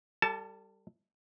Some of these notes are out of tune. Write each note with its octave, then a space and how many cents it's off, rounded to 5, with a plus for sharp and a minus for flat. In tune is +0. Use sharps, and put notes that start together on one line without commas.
G3 +0 A4 +35 A5 -15